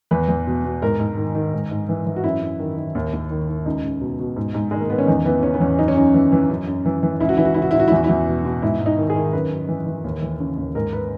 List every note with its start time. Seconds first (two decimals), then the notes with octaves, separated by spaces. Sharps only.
0.11 E2 B4
0.28 E2
0.47 B2
0.65 B2
0.82 G#2 A#4
1.00 G#2
1.17 D#3
1.35 D#3
1.53 G#2
1.71 G#2
1.89 E3
2.06 E3
2.16 F#4
2.24 F#2 E4
2.41 F#2
2.60 D#3
2.77 D#3
2.95 D#2
3.13 D#2
3.31 D#3
3.49 D#3
3.66 C#2 D#4
3.83 C#2
4.01 B2
4.19 B2
4.36 G#2
4.54 G#2
4.71 D#3 G#3
4.81 A#3
4.90 D#3 B3
4.99 C#4
5.08 E2 D#4
5.25 E3 B3
5.43 C#3 C#4
5.54 B3
5.60 E2 C#4
5.79 F#2 D#4
5.88 C#4
5.96 F#2 D#4
6.14 E3
6.32 E3
6.49 F#2
6.67 F#2
6.86 E3
7.03 E3
7.20 C#2 E4
7.29 F#4
7.37 E3 E4
7.45 F#4
7.54 C#3 E4
7.62 F#4
7.71 C#2 E4
7.80 F#4
7.88 E4
7.92 E2 F#4
8.04 E4
8.09 E2
8.26 B2
8.45 B2
8.62 G#2 E4
8.80 G#2
8.86 D#4
8.98 D#3
9.10 G#4
9.16 D#3
9.33 F#2 B4
9.51 F#2
9.69 E3
9.87 E3
10.04 D#2
10.22 E3
10.40 C#3
10.57 D#2
10.75 G#2 A#4
10.93 B4